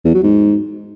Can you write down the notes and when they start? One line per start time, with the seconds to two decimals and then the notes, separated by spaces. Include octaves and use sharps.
0.05 E2
0.14 F#3
0.23 G#2